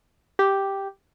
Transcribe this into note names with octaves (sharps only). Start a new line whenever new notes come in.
G4